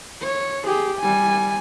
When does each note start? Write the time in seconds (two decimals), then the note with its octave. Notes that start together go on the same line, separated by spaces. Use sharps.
0.23 C#5
0.66 G4 G#4
0.99 G3 G#5